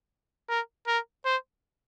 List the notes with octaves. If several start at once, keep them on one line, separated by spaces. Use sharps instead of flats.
A#4
A#4
C5